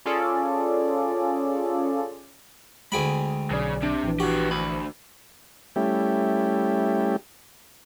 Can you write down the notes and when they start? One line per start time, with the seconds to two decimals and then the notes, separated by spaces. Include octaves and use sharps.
0.05 C#4 F4 G#4 A4 D5
2.92 D2 G#3 G#4 G5 G#5 B5
3.51 B1 C#3 D5
3.83 C3 D4
4.04 A#1 E3
4.20 B3 F#4 G4
4.51 D2 C5 B5
5.76 G3 A3 C#4 E4 G4